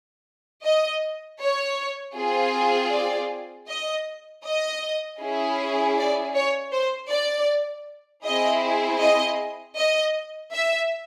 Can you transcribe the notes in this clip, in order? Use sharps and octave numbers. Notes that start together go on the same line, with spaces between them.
D#5
C#5
C4 F4 G#4
D5
D#5
D#5
C#4 E4 G#4
D5
C#5
C5
D5
C4 E4 G#4 D#5
D#5
D#5
E5